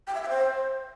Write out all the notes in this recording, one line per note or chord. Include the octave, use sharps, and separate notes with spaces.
G5
E5
G5
C5